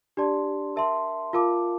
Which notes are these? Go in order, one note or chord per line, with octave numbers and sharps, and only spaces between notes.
D4 G4 D5 A5 C6
A#4 E5 A5 C6
F4 A#4 F5 A5 D6